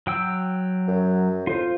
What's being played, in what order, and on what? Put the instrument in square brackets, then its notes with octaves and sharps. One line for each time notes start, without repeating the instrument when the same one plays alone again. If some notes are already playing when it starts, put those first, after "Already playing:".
[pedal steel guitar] F#3 G5 E6
[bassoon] F#2
[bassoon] F2 [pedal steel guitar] F4 C5